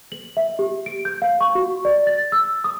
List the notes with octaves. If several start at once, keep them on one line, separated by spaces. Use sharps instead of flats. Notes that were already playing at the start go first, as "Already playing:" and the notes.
F#7
E5
G4
D7
G6
F5
C#6
F#4
D5
A6
E6
D#6